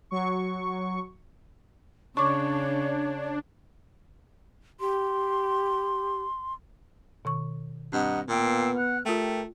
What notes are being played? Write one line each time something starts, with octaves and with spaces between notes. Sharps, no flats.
F#3 C#6
C#3 D4 C#5 C#6 D6
G4 C6
B2 D#3 C#6
G2 C4 D#5 F#5 A#5
A#2 B3 F5 G5 E6
F#5 F6 F#6
A3 F4 G4 A#4 G5